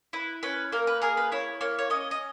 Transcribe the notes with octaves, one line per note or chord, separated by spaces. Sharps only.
E4 B4
C#4 B4
A#3 A#4
B4
G#4 A#4
B4
E4 C#5
A#3 C#5
C#5
C#4 D#5
D#5